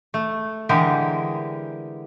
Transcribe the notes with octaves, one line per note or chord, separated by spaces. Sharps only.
A3
D3 E3 G#3 G4 A#4